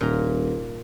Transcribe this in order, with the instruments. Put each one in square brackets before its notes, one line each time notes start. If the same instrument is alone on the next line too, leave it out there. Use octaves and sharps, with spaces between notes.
[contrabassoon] D#1 [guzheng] A#2 A#5